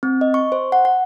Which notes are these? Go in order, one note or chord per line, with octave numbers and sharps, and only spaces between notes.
C4
D#5
C#6
C5
F#5
F#5